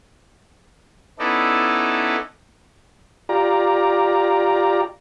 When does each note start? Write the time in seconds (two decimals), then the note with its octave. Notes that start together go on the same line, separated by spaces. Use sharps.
1.19 B3 C#4 D#4 E4 A4 D5
3.29 F4 G4 D5 A#5